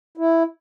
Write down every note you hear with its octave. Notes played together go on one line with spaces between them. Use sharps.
E4